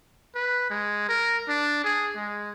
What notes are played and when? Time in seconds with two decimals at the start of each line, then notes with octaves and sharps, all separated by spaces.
0.35 B4
0.70 G#3
1.09 A#4
1.49 D4
1.84 G#4
2.16 G#3